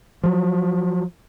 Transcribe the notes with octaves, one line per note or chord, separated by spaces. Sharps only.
F3 F#3